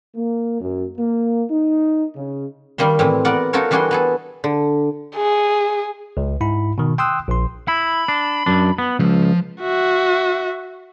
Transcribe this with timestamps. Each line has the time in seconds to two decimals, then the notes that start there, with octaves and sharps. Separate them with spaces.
0.15 A#3
0.61 F#2
0.97 A#3
1.50 D#4
2.16 C#3
2.78 D#3 G3 A#3 C6
2.99 A2 E3 C4
3.25 B3 A#4 D5 F#5
3.53 D#4 F4 F#4 A4 A#4 C#5
3.71 E3 G3 D4 F#4 G#4 C6
3.91 B3 G#4 A4
4.44 D3
5.16 G#4
6.17 C#2
6.41 G#2 E4 B5
6.78 B2 D#3
6.98 G5 C6 D#6 E6 F#6
7.28 A#1 C6
7.68 E4 B5
8.08 D4
8.46 F#2 D4
8.78 B3
8.99 C#2 F3
9.61 F#4 E5